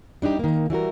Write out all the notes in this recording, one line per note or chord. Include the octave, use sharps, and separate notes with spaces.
G3 D4 D#4 G4
D#3 A#3
E3 G3 F#4 A#4